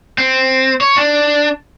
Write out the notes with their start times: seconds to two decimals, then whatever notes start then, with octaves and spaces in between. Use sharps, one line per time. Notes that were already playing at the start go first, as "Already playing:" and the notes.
0.18 C4
0.81 C#5
0.97 D4